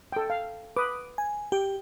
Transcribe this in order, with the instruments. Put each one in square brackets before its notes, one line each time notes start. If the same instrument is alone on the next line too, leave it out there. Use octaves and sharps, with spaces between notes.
[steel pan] A4 G5
F5
[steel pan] B4 [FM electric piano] D6 D#6
[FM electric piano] G#5
[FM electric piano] G4 [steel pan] G5